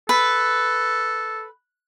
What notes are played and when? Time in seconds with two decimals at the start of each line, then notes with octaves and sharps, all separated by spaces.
0.09 A4 B4